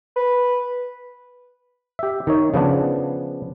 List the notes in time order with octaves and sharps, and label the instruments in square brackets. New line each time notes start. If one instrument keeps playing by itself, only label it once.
[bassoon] B4
[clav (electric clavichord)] G4 E5
D#3 D#4 C#5
C#3 F3 B3 D4